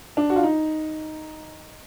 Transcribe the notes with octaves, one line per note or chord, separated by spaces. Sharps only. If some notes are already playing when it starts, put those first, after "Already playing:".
D4
F#4
F4
D#4